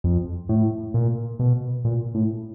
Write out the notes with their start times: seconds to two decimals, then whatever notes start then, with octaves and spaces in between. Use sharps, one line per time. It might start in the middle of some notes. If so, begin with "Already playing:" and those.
0.04 F2
0.49 A2
0.94 A#2
1.39 B2
1.85 A#2
2.15 A2